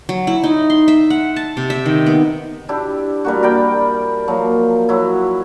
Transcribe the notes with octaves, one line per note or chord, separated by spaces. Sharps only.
F#3
E4
D#4
C6
E5
F#5
A5
C3
E5
D#3
B3
D4 E4 G4
G3 A#3 F#4
A#4 D5 G5 B5
F3 F#3 A#3
F#3 E4